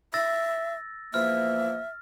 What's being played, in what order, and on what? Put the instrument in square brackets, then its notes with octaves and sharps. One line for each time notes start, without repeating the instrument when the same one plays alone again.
[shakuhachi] E5 [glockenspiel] E6 A6 A#6
[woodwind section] E2 F3 A#3 [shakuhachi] E5 [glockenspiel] F6